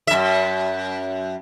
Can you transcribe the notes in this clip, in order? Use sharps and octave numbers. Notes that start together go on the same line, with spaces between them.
F#2 E5